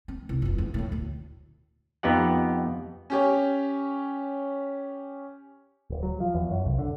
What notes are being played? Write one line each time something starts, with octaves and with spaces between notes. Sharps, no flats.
C4
C2
F1 E2
E2
A2 A3
D2
F2 B3 D#4 G4 F#5
C#4 G4 C#5
D1
F#3
F3
E2
F#2
C2
D3